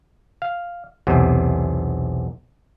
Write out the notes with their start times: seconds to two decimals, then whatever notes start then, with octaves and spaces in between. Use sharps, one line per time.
0.42 F5
1.07 B1 E2 C3